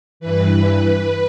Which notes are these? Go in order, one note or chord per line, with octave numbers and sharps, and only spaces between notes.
G2 E3 B4